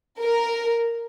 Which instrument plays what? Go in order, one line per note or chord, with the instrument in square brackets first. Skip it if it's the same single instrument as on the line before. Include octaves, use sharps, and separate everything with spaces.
[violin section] A#4